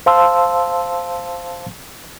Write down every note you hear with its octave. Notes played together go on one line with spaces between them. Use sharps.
C5 F5 A5 C6 E6